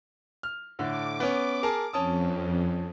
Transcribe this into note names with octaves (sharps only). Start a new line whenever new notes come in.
F6
A2 D3 D6
B3 C#4
G#4 A#4 A5
F2 C#4 A5 D#6